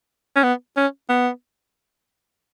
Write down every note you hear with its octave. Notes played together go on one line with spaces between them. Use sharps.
C#4
B3
C#4
B3